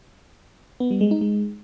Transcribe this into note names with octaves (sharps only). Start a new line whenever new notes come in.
B3
G3
G#3
D#4
G#3